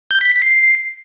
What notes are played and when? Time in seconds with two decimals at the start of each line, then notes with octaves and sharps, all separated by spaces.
0.11 G6
0.21 B6
0.32 B6
0.42 C7